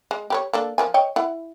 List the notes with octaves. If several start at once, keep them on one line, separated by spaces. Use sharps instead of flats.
G#3
G4 B4 C#5
A#3 D4 A4
F3 A#4 G#5
C#5 D#5 G5
E4 F#5